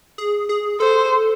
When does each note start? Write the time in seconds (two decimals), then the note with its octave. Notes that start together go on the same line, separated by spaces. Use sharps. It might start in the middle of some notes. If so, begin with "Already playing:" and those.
0.18 G#4
0.49 G#4
0.80 A4 C5